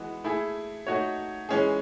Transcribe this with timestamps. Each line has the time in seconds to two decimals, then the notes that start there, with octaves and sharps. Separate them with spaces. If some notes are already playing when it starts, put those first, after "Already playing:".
Already playing: E3 G#3 B3 F#4
0.24 A3 E4 G#4
0.87 A3 D#4 F#4 C#5
1.49 E3 G#3 C#4 G#4